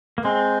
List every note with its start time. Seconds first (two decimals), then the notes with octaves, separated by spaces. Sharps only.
0.18 A#3
0.24 G#3 C4